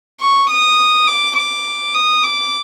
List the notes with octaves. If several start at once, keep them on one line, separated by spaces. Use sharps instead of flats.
C#6
D#6
D6
D6
D#6
D6